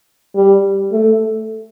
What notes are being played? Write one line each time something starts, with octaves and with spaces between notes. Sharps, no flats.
G3
A3